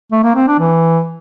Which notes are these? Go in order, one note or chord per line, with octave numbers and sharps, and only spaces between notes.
A3
A#3
C4
D4
E3